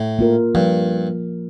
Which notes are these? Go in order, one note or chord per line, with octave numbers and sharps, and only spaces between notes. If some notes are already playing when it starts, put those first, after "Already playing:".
Already playing: A2
A#3 F4 A#4
G2 F3